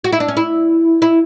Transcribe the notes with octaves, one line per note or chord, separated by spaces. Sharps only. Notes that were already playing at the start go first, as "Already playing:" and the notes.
F#4
E4
D4
C#4
E4
E4